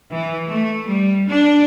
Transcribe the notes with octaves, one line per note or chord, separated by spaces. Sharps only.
E3
A3
G3
D4